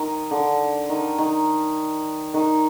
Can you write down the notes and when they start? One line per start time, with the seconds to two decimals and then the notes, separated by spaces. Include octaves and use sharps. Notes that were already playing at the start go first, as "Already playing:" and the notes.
Already playing: D#3
0.31 D3
0.90 D#3
1.18 D#3
2.34 D#3